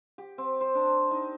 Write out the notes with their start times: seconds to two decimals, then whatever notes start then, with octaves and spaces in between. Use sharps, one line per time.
0.18 G4
0.38 C4
0.61 C5
0.75 D4
1.11 D#4